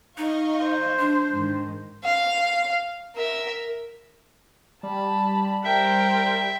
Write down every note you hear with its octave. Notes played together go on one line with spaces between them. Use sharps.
D#4 D#5 F5 C#6
C5
D4
G#2 D#3
F5
A#4 E5
G3 A5 B5
A#4 C5 E5 G5